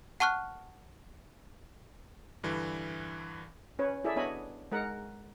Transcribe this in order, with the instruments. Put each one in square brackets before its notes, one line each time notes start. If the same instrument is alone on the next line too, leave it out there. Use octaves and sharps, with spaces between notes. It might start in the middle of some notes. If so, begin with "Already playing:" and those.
[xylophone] F#5 A5 C#6 F6 F#6
[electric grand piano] G2 D3 E3
[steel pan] C#4 B4 C#5
E4 G#4 A4 D5 E5
B3 D4 C#5 D#5 G#5 B5
G#3 A#4 F#5